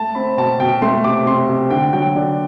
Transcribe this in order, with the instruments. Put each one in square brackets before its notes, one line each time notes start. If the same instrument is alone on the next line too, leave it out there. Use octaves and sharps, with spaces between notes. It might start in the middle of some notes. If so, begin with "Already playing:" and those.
Already playing: [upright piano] A3 A5
C4 B5
B2 A5
B2 G5
A3 C6
C3 D6
C3 C6
C3
D3 G5
F#3 G5
D3 D5